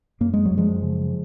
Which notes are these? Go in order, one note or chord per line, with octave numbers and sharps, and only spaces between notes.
F#2 A#3
G#3
F#3
F#2
F3 G#3
C#3